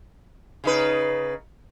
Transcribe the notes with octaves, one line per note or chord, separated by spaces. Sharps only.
C#3 D#4 B4